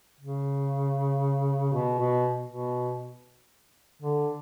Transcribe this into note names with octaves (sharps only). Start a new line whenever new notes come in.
C#3
B2
B2
B2
D3